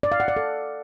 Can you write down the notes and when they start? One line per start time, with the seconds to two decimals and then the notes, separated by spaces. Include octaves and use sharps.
0.03 D5
0.12 F5
0.20 F#5
0.28 D5
0.36 A4